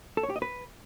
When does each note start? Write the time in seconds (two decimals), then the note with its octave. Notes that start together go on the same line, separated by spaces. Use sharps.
0.17 A4
0.23 C#5
0.30 G4
0.36 D#5
0.42 B4